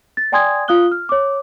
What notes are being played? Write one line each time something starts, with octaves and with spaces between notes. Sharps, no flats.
A6
D5 G5 G#5 C6 D#6 G#6
F4 F5 D#6 F#6 G7
F6
C#5 D6